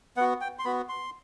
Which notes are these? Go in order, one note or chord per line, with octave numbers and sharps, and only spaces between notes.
B3 F#4 F#5
G5
C6
B3 F#4 B5
C6